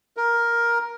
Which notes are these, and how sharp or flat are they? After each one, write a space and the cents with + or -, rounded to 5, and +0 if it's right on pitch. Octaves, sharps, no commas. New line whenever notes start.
A#4 +10